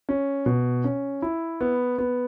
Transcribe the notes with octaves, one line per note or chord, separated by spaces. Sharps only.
C#4
B2
C#4
E4
B3
B3